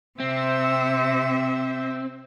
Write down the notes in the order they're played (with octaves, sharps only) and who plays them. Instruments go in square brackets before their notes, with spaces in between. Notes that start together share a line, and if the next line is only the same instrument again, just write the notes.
[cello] C3 E5 [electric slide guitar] C4